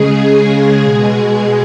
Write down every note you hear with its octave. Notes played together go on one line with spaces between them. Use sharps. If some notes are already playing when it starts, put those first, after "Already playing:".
Already playing: C#3 G#3 G#4
B2 G#3 G#4